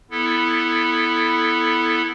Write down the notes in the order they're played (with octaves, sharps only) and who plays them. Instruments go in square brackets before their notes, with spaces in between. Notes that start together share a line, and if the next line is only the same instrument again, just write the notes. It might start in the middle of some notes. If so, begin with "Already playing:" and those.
[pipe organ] B3 E4 A4